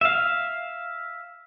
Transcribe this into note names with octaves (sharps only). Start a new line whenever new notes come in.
E5 F5